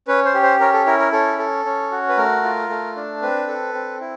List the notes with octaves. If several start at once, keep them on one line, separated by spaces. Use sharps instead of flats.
C#4 B4
C5
G4
C5
C#4 A#4
A4
E4 A#4
A#4
C#4 A4
A4
C#4
F#4
B4
A3 A#4
F4
A3
D4
C4 B4
A4
C4
E4